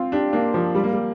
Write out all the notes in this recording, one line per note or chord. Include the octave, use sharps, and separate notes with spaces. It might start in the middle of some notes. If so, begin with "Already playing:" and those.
Already playing: C4 F4
D4 G4
A#3 D4
F3 A#3
G3
A#3
G3